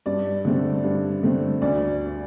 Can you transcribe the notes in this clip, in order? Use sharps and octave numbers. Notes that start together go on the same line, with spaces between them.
G2 D5
D3 A3 C4
G2
D3 A3 C4
D2 D5